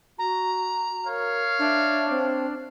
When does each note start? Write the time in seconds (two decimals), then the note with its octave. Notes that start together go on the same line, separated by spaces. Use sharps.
0.19 F#4 A#5
1.07 A#4 C#5 F5
1.59 D4 E5
2.09 C4